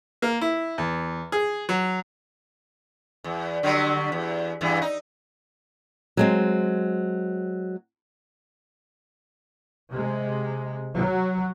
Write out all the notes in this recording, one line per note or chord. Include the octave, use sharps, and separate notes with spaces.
A#3
E4
E2
G#4
F#3
E2
D3 F#3 G3
E2
E2 G2 E3
D#4
F#3 G#3 C4
C3 G#3
F#3